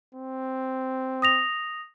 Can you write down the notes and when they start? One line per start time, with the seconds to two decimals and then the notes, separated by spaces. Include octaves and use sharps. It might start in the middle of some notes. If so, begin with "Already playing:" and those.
0.15 C4
1.22 D#6 A#6 F7